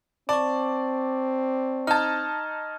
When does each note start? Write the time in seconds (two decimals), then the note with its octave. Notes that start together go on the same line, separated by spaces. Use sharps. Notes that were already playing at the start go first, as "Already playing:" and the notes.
0.29 C4 D5 A5 C#6
1.87 D#4 A5 F6 G#6